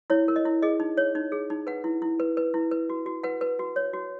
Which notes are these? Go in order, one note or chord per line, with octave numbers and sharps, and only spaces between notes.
E4 C#5
A#4
D#5
E4
G#4 D#5
D#4
C#5
D#4
G#4
D#4
B4 F#5
E4
E4
B4
B4
E4
B4
F#4
F#4
B4 F#5
B4
F#4
C#5
F#4